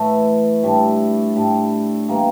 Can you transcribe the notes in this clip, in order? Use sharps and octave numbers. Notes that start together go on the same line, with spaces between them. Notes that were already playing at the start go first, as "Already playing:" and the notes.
Already playing: A2 E3 A3
A2 G3 D4
A2 G3 D4
E3 G3 A#3